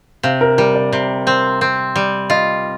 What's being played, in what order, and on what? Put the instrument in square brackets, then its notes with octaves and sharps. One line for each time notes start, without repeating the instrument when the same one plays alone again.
[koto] C3 [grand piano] F5
[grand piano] A#4
[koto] G3 [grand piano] A#4
[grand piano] D5
[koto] C3
C4
C4
G3
[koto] F4 [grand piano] D#5